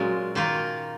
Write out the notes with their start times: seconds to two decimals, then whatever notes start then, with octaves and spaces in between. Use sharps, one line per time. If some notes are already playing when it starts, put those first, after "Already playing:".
Already playing: A#2 F#3 G#3 C#4 F4 A#4
0.35 D#3 A#3 F4 A#4